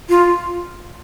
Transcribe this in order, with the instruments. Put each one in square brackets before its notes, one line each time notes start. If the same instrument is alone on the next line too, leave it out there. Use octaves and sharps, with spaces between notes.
[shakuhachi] F4